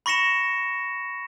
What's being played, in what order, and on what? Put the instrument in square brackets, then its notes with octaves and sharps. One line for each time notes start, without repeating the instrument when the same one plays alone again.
[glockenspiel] B5 C#6 A#6 C#7 E7